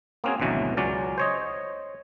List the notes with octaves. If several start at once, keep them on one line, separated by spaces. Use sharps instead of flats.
A#3 C4 C#4 F#4 G#4
G#1 D2 B2 E3 F#3
C#2 F#3 C#4 D5
C5 C#5 D#5